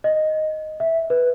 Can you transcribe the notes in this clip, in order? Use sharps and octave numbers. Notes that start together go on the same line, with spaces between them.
D#5
E5
B4